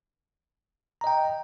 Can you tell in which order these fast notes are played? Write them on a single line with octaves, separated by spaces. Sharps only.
A#5 D#5 G5